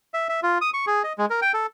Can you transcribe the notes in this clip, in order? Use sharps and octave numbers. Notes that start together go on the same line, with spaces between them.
E5
E5
F4
D#6
C#6
G#4
D#5
G#3
A#4
G5
A4